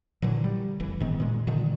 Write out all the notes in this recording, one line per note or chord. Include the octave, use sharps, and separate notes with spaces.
A#2 D3 E3 F#3
G3
F1 E3
G#2 D#3 B3
A#2 G#3
A#2 D3 D#3